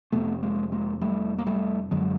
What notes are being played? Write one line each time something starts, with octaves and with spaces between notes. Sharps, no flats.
F1 F2 C3 A3 B3
G#3 A#3
G#3 A#3
G3 A3
A#3
G3 A3
F#2 D3 F#3 G#3